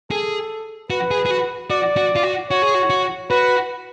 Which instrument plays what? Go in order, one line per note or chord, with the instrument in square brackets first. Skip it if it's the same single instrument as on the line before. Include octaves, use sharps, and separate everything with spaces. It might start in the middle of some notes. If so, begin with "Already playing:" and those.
[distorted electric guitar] G#4 [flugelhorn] A4
[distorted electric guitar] F#4 [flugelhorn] B4
[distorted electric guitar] G#4
G#4
F#4
[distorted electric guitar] F#4 [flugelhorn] D5
[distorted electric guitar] F#4
F4
F#4
[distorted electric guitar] F#4 [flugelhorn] C#5
[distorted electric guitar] G#4
F#4
F#4
[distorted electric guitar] F#4 [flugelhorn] B4